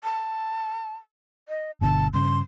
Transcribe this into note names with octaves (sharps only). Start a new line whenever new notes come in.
A5
D#5
G1 B2 D3 A5
G2 C#3 C6